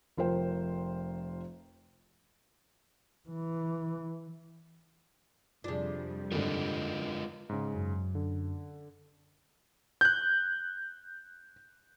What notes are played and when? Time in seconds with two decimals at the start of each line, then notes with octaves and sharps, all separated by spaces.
0.17 F1 F4 A#4 C5 G5
3.29 E3
5.64 F2 C3 G3 D4 F4 G#4
6.32 G#1 G2 D3 G#3 F4 A#4
7.49 G#2 C#3
7.74 F#2
8.15 D3
10.01 F#6 G6